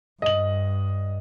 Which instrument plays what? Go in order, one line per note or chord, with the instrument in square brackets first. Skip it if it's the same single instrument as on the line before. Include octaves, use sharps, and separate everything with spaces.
[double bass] G2 [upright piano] D#5 F#7